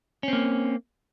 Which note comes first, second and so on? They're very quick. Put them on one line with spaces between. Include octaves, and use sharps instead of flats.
C#4 C4 A#3